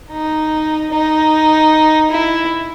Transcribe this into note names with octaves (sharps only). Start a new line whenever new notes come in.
D#4
D#4
E4